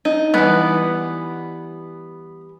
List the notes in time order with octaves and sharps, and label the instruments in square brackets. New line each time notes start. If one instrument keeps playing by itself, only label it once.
[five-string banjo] D#4
[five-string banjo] E3 G3 G#3 [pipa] B3